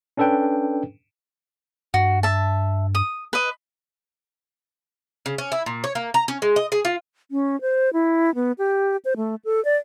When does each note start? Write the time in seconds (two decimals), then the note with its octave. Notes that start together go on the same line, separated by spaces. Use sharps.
0.17 C#4 D4 A4 B4 G5
1.94 G2 F#4
2.23 E5 A5
2.95 D#6
3.33 B4 D#5
5.26 C#3
5.38 C#4
5.52 E4
5.66 A#2
5.84 C#5
5.95 A#3
6.14 A#5
6.28 C#4
6.42 G#3
6.56 D#5
6.72 G#4
6.85 F4
7.31 C#4
7.61 C5
7.93 E4
8.35 B3
8.58 G4
9.05 C5
9.17 A3
9.45 A4
9.65 D5